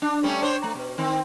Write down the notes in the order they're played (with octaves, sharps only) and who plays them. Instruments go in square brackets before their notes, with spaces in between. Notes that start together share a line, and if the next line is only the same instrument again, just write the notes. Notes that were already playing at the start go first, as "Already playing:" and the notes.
[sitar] D4
G3 A3 C#4
D4 C5 C#5
A3
B2
D#3 C4